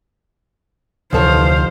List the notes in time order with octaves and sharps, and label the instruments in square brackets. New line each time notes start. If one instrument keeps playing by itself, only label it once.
[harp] F1 D#6 [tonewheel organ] D2 [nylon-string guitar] E3 A4 C#5 [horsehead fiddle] C5 F5